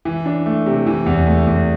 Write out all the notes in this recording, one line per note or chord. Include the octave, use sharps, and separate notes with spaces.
E3
D4
A3
C3
E3
E2
A3
E2